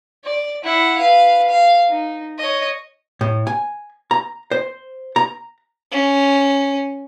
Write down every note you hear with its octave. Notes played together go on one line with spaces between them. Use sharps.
D5
E4 F#5
B4 F5
F5
D#4
C#5 D#5
A2
G#5
A#5
C5
A#5
C#4